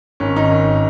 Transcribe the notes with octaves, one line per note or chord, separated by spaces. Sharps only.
G#1 C#4
D#3 D#4
G#1